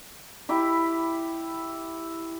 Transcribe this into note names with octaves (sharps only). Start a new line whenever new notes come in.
E4 G4 B5